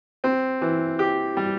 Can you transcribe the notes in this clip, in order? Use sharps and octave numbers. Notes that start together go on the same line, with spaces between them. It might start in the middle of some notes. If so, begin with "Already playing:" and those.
C4
E3
G4
G3